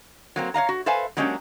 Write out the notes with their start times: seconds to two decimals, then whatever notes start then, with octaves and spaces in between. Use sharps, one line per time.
0.36 F#3 A#3 C4
0.54 C#5 D#5 F5 A#5
0.69 F#4
0.86 A4 B4 C5 E5 F5 G#5
1.17 F#3 G#3 A#3 C#4 D4 G4